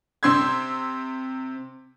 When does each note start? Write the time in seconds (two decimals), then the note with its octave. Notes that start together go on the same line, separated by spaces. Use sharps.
0.23 C3 C4 C6 E6 G#6